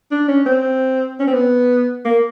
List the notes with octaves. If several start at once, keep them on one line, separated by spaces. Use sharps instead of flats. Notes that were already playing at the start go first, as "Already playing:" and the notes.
D4
C#4
C4
C#4
C4
B3
A#3